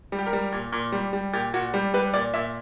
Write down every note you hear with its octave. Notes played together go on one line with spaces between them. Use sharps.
G3
G4
A#4
G3
A#2
A#2
G3
G3
A#2 G4
A#2 F#4
G3
G3 B4
A#2 D5
A#2 E5